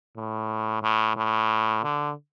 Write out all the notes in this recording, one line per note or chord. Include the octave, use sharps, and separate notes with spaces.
A2
A2
A2
D3